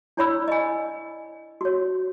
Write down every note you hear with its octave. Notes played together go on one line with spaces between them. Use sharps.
D4 E4 C#5 D5 B5 E6
D#5 G#5
F#4 C#5